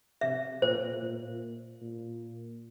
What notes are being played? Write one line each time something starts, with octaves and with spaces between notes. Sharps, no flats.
C3 E5
A#2 C5
A#2
A#2